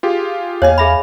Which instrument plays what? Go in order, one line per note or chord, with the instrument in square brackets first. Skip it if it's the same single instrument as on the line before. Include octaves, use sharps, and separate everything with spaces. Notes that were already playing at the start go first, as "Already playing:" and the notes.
[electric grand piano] F4 G4 G#4
[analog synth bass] E2 [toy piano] C#5 D#5 [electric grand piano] F5 G#5
[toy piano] G#4 E5 B5